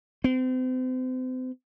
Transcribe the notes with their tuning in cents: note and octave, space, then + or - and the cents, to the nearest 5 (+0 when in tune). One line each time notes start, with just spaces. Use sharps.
C4 -35